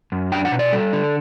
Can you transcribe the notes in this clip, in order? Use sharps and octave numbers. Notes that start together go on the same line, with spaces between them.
F#2
D4 G5
F#5
B2
D5
G3 A4
D3